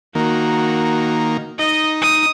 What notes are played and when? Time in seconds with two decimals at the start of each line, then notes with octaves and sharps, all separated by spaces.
0.15 D#3 A#3 F#4
1.59 D#4 D#5
2.02 D#6